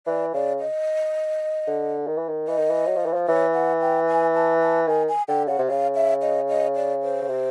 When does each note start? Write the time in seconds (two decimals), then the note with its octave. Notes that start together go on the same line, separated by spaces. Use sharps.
0.07 E3 D5
0.34 C#3 D5
0.60 D#5
1.67 D3
2.07 D#3
2.17 E3
2.28 D#3
2.48 E3 D#5
2.58 D#3
2.69 E3
2.87 F#3
2.96 F3
3.06 E3
3.14 F3
3.28 E3 C#5
3.54 F#5
3.81 G5
4.08 G#5
4.35 A5
4.61 A5
4.87 D#3 G#5
5.09 G#5
5.28 D3 G5
5.48 C#3 F#5
5.59 C3
5.68 C#3 F5
5.95 E5
6.22 D#5
6.48 D#5
6.75 D5
7.02 C5
7.22 C#3
7.28 C3